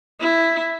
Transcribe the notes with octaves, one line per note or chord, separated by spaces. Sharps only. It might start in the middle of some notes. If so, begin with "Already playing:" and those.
E4